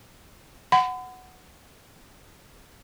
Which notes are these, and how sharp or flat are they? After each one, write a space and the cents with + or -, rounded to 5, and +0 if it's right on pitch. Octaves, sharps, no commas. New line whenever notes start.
F#5 +0 B5 +40